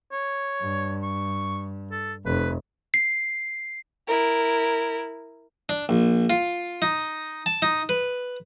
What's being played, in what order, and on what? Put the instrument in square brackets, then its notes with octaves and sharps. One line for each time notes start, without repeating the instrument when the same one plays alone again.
[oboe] C#5
[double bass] G2
[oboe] C#6
A4
[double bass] F1 [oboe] B4
[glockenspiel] C7
[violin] E4 A#4
[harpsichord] D4
A#1
F4
D#4
A5
D#4
B4